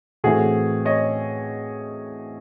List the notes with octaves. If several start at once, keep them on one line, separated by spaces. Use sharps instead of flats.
A2 E3 A3 C4 F#4 G#4
C#5 D#5